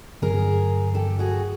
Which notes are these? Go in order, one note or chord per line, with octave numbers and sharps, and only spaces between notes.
G2 D3 F#3 B3 G#4 A#4
G4 A4
F#4 G#4